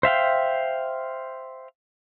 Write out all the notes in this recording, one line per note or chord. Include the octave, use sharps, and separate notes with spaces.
C5 E5 F5 G5